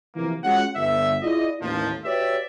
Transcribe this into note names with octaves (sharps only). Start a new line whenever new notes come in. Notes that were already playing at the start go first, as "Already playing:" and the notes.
C3 E3 F3 A#3
G#3 C#4 F4 F#4 F#5
G1 E5
E4 F4 G#4 D5 D#5
A1 D#2 F3
F#4 G4 B4 C#5 D5 E5